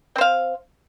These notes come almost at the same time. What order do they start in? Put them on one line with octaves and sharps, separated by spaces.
C4 C5 F5